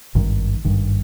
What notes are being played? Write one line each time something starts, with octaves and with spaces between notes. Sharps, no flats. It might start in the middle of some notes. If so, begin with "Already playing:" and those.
G#1 G2 D#3
G#1 G2 D#3